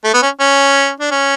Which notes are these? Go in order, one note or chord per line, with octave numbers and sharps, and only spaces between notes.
A3
B3
C#4
C#4
D4
C#4